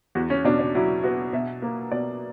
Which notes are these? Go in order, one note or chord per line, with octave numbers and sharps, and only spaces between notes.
E2 F#4
C#4
B2 D4
D4
F#3 E4
B3 F#4
B2 E5
A#3
B2 D5